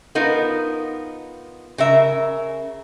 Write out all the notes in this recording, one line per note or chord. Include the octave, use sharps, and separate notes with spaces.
B3 D#4 F4 A#4
C#3 A#4 E5